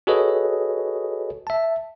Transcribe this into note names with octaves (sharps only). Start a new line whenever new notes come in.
F#4 G#4 A4 B4 C#5 D#5
E5 A5